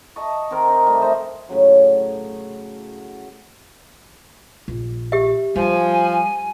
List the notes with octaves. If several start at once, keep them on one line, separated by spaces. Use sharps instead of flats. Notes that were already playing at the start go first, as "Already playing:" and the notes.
D#5 A5 C#6
D#3 C4 A#4
D#4
G3 A3
C5 D#5 E5
A2 C#3 F#3
A#1
G4 E5
F3 G3 G#5